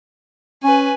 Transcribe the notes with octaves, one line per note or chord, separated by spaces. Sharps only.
C#4 B4 G#5